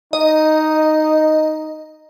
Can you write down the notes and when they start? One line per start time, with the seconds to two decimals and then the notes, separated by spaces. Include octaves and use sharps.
0.13 D#4 D#5